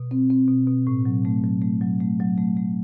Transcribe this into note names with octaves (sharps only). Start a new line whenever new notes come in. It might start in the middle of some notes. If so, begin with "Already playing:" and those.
Already playing: B2
C4
C4
B2
B2
A2
F#3
A3
F#3
A3
F#3
A3
F#3
A3
A3